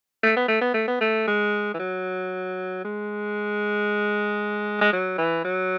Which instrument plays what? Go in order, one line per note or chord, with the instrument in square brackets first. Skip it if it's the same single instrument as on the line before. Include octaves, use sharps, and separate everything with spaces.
[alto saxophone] A3
B3
A3
B3
A3
B3
A3
G#3
E3
F#3
G#3
G#3
F#3
E3
F#3